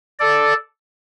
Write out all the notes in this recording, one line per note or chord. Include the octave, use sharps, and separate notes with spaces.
A4 D5